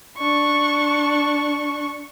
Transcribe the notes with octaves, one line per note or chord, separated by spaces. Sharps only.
D4 C#6